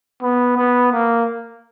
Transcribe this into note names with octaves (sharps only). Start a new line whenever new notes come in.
B3
B3
A#3